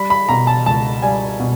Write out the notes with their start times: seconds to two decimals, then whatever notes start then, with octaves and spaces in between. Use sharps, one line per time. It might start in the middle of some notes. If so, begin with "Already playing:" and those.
Already playing: G3 B5
0.10 B5
0.29 B2 A#5
0.47 A5
0.66 C#2 A5
1.02 G3 G#5
1.40 B2